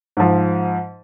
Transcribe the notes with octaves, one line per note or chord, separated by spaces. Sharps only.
G#2 F3